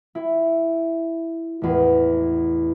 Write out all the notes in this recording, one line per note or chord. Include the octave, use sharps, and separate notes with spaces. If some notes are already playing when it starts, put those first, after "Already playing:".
E4
A1 E2